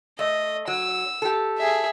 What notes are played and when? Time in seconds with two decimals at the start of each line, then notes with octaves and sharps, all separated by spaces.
0.19 A3 D#5
0.67 F#3 E6
1.22 G4 A4
1.57 G#4 E5